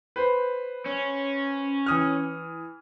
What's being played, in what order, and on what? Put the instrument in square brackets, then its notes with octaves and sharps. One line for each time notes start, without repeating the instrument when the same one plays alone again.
[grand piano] B4 C5
[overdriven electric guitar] C#4
[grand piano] E3 D#6 F6